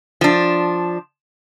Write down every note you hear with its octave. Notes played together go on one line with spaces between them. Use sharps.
F3 D4